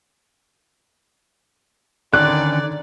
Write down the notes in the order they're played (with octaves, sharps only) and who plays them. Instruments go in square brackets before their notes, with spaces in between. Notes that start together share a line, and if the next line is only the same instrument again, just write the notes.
[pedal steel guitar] D3 D#3 C#4 [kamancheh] D5 [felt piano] F#6